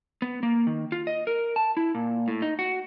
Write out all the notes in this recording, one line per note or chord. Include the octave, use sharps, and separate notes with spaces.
B3
A#3
D#3
F4
D#5
A#4
A5
E4
A#2
A2
D#4
F#4